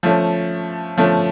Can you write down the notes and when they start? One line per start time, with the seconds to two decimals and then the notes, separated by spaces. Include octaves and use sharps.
0.03 F3 A3 C#4
0.97 F3 A3 C#4